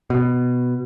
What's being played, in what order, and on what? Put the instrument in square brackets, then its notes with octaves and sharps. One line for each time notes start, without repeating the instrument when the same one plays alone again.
[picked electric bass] B2